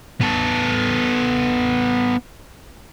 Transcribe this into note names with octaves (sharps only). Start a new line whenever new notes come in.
B3 A4